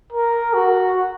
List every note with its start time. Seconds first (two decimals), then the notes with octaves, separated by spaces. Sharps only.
0.12 A#4
0.54 F#4